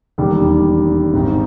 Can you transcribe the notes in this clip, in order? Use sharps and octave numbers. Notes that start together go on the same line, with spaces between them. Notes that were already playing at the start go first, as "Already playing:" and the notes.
E1 D#2 D#3 G3
G#1 G#2 D#3